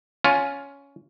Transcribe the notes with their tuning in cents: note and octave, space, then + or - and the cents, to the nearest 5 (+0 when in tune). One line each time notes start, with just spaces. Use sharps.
C#4 +10 F4 +10